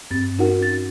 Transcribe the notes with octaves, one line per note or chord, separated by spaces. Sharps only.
G2 C4 A6
C#4 D#4 F#4 A#4 F#5
A6